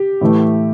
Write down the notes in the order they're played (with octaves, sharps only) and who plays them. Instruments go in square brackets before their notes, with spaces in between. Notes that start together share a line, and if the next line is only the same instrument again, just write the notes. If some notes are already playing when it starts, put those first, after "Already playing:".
Already playing: [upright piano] G4
A2 E3 A3